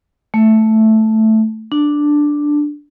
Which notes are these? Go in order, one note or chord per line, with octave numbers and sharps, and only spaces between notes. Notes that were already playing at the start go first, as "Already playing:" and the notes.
A3
D4